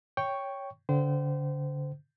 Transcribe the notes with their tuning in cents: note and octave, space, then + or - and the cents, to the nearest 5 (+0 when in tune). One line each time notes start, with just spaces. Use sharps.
C#5 +5 G5 +0 C#6 +0
D3 -30 C5 -25 G5 -35